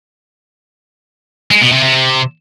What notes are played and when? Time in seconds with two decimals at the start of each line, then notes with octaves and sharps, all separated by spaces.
1.51 G#3
1.61 B2
1.72 C3
1.83 C3